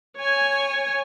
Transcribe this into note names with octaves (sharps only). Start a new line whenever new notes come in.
C#5 G#5